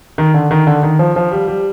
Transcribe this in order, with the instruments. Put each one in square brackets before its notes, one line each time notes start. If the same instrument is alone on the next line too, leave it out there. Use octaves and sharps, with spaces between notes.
[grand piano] D#3
D3
D#3
D3
D#3
F3
F3
G3
G3